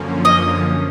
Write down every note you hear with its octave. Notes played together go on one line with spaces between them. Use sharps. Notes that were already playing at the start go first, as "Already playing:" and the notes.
Already playing: F#2 D3 F3 A#3 C#4
D#5